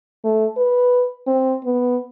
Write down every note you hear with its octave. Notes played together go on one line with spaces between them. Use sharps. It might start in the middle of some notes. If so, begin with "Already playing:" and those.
A3
B4
C4
B3